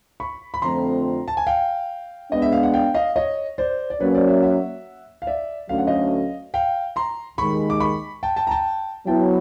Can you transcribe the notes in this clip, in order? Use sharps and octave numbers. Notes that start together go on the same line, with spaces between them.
B5 C#6
B5
F2 D3 F3 A3 C4 A#5 C6
A5
G#5
F5 G5
G#3 B3 D4 D#5
E5
F5
F#5
F5 G5
D#5 F5
C#5 D#5
C5 D5
D5
F#3 A#3 C#4 B4 C#5
C5 D5
D5 E5
E5 F#5
F5
D5 E5
D2 D3 F#3 A3 C#4 F5
F#5
D#5 F5
F5 G5
A#5 C6
D#2 D#3 G#3 B5 C#6
D6
B5 C#6
G5 A5
G5 A5
A#5
G5 A5
F#3 B3 E4 G5 A5